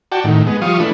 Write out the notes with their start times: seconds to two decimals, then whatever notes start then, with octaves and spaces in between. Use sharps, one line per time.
0.12 F#4 D5 G5 A5
0.24 A2 D#3
0.46 G#3 B3
0.62 F3 G3 F5 C#6 D#6
0.80 E3 A3 D4 B4